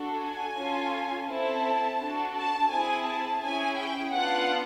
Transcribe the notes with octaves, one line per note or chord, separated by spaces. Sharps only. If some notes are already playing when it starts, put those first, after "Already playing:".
Already playing: D4 F#4 A4
G#5
C#4 F4 A4
C4 E4 A4 A5
D4 F#4 A4
A5
C4 E4 G#4 G#5
A5
C#4 E4 G#4 G#5
G5
B3 D4 F4 F#5